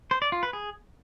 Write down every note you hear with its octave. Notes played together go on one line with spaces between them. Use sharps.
C5
D5
F4
B4
G#4